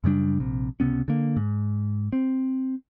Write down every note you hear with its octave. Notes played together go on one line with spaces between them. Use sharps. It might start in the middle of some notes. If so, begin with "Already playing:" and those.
F#2 C#3 G3 D4
A#1 C3
C#2 C3 B3 C#4
D3 A#3
G#2
C4